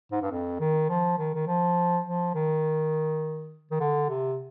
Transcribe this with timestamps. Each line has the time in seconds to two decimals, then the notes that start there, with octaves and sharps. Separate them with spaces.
0.12 G#2
0.22 G2
0.31 F2
0.60 D#3
0.89 F3
1.18 D#3
1.34 D#3
1.47 F3
2.05 F3
2.35 D#3
3.71 D#3
3.80 D3
4.09 C3